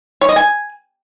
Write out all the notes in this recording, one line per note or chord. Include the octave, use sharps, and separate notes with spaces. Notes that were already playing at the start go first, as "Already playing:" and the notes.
C#5
D#5
G#5